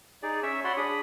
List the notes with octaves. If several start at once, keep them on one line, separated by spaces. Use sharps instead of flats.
D#4 G#4 D5
C#4 C#5 E5 E6
F#4 C#5 D5 F#5 B5 C6
D4 G#4 B5 D#6